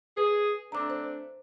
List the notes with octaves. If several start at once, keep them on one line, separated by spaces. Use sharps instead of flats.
G#4 B4
A3 C4 D4 A#5 D6
C5